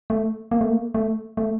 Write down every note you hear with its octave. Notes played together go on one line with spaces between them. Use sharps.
A3
A#3
A3
A#3
A3
A3